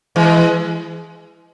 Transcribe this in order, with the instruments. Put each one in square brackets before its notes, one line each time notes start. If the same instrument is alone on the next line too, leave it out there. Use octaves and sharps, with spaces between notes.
[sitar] E3 G#3